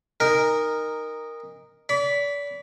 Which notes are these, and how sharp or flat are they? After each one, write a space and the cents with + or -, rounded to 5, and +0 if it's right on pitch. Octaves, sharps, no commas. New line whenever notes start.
D#4 -10 A#4 +0 G#5 -45
D5 -35 B5 +0